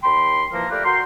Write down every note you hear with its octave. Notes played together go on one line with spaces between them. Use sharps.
D#2 G5 B5 C6
E3 F3 A#3 A#4
A3 F4 G4 A#4 B4 D5
F#4 A#4 G5 C6